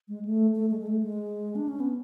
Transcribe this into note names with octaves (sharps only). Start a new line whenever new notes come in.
G#3
A3
A3
G#3
G#3
A3
G#3
D4
C#4
B3